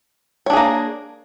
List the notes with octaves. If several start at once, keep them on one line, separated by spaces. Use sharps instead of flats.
A#3 D4 G#4 C#5